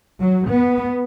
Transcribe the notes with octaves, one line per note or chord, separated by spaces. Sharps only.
F#3
B3